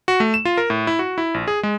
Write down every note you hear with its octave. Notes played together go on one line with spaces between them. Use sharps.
F#4
A3
E7
F4
A#4
A2
E4
F#4
E4
A#1
G#4
G#3